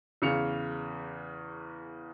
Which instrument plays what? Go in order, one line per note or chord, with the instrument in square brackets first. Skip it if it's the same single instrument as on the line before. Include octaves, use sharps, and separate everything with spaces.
[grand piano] E2 C#3 C#7 F7